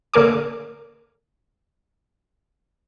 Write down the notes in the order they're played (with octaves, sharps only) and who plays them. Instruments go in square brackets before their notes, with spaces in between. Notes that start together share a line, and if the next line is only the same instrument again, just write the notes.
[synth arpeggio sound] D3 A#3 A#4 G#5 D6